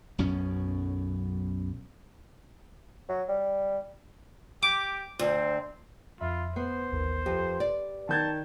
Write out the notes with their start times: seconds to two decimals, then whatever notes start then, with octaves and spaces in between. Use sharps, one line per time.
0.18 B1 F#2 B2 C#4
3.09 F#3
3.29 G3
4.63 G4 D6
5.19 D2 C4
6.20 F2 F4 E5 B5
6.56 B3 C5 C7
6.92 A1 D#2 A#4
7.26 F2 G4 B4
7.60 D5
8.09 D#3 A5 G6 G#6